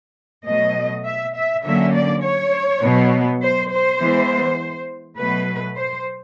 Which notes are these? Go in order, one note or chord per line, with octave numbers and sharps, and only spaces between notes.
B2 F#3 A3 D#5
E5
E5
D3 F#3 A#3 C#4 E5
D5
C#5
B2 F#3 B3
C5
C5
E3 G#3 B3
B2 F#3 A3 B4
C5